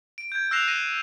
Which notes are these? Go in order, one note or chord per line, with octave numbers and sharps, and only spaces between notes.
D7
G6 G#6
E6 F#6 A#6 C7 E7 F7
A#6 D#7